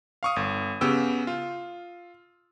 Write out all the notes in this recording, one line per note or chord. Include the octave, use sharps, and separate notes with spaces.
F5 C#6 D#6
G1
C#3 B3 G4 G5 E6
F4